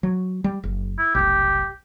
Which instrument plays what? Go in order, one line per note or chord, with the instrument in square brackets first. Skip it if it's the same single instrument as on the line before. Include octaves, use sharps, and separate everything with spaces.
[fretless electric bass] F#3
G3
F#1
[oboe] E4
[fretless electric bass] F1 B1 [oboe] G4